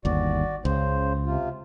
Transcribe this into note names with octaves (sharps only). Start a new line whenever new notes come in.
G1 D#2 F#4 D5
C#2 C#3 C5
C3 F4